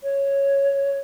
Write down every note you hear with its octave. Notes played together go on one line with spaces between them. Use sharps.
C#5